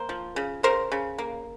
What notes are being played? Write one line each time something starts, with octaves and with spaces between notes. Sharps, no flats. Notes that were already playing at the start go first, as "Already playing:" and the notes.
Already playing: A#3 A#4 C5
F3
C#3
C#3 A#4 C5
C#3
A#3